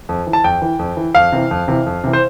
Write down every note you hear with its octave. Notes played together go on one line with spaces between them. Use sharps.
F2
E3
A5
F2 G5
E3
F2
E3
F2 F5
C3 E3
F2
C3 E3
F2
C3 E3
C5